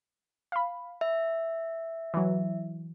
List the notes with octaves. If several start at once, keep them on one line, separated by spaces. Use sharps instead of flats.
F5 B5
E5
E3 F#3